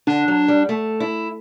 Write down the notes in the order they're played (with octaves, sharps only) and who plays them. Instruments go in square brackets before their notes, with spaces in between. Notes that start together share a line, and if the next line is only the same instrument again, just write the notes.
[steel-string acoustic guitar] D3 [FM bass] D4
[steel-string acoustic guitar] F#3
G3
A3
E4